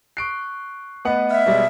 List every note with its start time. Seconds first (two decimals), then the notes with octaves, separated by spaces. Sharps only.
0.17 C#6 F#6 C7 D7
1.05 A3 B3 B4 D#5 F#5
1.31 E5 F6
1.46 B2 G3 G#3